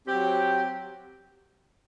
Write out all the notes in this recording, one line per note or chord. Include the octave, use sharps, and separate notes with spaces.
F#3 C4 G4